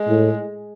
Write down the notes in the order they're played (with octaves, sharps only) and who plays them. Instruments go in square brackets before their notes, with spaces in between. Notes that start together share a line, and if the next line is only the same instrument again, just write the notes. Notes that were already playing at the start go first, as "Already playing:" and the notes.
Already playing: [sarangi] G#3
[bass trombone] A2